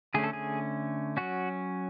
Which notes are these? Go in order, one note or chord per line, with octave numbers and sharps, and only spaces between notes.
D3 A3 C#4 G#4
A4
G#4
F#3 C#4 F#4